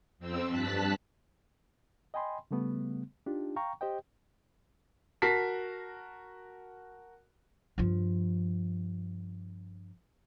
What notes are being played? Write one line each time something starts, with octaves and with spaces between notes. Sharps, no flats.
F2 C4 E6
G2 A5 F#6 B6
D#5 G5 G#5 B5 C6
C#3 G3 A3 B3
D4 D#4 F4 G4
F5 G5 A#5 C#6
G4 C5 D#5 G5
F#4 A#4 A5 B6 C7
G2 F3